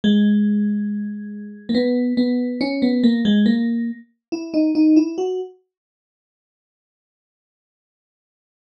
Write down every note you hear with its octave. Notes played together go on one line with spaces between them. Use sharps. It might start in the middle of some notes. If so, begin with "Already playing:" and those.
G#3
A#3
B3
B3
C#4
B3
A#3
G#3
A#3
E4
D#4
D#4
E4
F#4